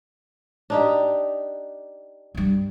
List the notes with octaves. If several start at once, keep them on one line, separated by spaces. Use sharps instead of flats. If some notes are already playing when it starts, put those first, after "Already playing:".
D4 D#4 G4
G2 G3